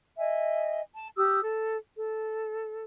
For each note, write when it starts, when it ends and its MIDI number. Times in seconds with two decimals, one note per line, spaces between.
0.18 0.81 75
0.18 0.81 76
0.18 0.81 80
0.94 1.08 81
1.16 1.39 67
1.16 1.39 87
1.16 1.39 88
1.42 1.76 69
1.97 2.84 69